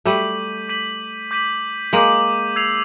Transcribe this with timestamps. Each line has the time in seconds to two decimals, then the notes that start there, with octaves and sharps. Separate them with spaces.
0.05 G3 A3 D6 G6 B6 D#7 F#7
0.68 D6 G6 B6 D#7 F#7
1.31 D6 G6 B6 D#7 F#7
1.93 G#3 A#3 D6 G6 B6 D#7 F#7
2.56 E6 G#6 C7 F7